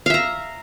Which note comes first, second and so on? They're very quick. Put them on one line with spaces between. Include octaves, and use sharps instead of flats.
F5 E5 A#5